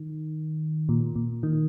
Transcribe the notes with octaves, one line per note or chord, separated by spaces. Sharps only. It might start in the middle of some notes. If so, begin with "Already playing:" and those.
Already playing: D#3
A#2
A#2
D#3